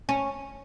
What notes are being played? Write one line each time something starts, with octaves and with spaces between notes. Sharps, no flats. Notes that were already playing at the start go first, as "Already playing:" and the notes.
C#4